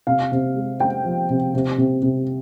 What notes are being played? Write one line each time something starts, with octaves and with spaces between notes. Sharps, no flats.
C3 F5
C3
G#3
G#3 G5
F3
C3
C3
C3
C3